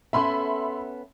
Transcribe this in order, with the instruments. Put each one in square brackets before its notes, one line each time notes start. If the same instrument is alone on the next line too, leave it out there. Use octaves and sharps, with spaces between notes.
[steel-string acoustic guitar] B3 C#4 A4 [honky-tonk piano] E5 B5 C6